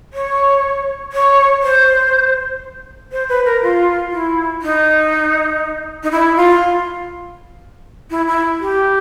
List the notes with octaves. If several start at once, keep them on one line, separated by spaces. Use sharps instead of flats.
C#5
C#5
C5
C5
B4
A#4
F4
E4
D#4
D#4
E4
F4
E4
E4
G4